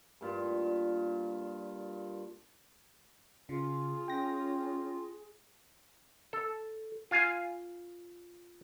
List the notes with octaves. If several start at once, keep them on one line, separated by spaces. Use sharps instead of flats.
G2 A#2 F4
C#3 F4 G#4
C#4 G5 A#6
A4
F4 F5 G#5